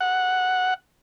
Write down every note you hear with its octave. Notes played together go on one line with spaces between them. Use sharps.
F#5